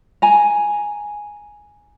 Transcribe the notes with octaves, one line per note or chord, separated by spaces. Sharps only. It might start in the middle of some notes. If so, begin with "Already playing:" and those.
G#5 A#5